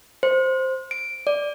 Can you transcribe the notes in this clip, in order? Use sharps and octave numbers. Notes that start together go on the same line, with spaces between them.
C5
D7
D5